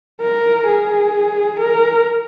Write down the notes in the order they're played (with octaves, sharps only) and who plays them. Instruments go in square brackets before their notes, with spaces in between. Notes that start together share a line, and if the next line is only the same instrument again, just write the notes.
[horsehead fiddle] A#4
G#4
A#4